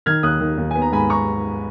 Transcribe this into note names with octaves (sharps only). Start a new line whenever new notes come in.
D#3 F6 G#6
D#2 D#6 F#6
D#3
D#2
B3 G#5
A#5
G#2 G#5 B5
A#5 C#6